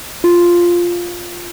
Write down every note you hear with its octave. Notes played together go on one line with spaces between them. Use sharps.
F4